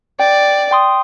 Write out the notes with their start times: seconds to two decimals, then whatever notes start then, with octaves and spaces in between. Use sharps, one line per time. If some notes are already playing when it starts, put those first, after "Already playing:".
0.20 D5 G5
0.71 G5 C6 D#6